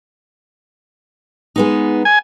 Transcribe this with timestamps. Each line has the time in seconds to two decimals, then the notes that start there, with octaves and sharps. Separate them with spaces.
1.56 G#3 B3 D#4
2.05 G#5